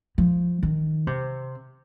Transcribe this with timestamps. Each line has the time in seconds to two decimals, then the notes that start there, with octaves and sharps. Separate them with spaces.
0.18 F3
0.63 D#3
1.07 C3